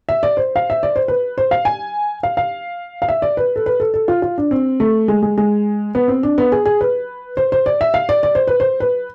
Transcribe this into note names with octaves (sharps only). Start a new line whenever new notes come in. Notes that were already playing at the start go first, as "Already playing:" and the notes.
E5
D5
C5
F5
E5
D5
C5
B4
C5
F5
G#5
F5
F5
F5
E5
D5
B4
A4
B4
A4
A4
F4
F4
D4
C4
A3
G#3
G#3
G#3
B3
C4
D4
B3
G#4
G#4
B4
C5
C5
D5
E5
F5
D5
D5
C5
B4
C5
B4